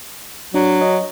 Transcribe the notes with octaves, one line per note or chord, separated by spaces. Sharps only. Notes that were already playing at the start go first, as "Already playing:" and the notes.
F#3 D4
C#5 D#5